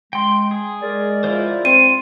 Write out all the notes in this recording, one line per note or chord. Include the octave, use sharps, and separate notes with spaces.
G#3 G5 C6
G#4
G#3 A#4 D5
E4 F4 C5
C4 G5 C6 D#7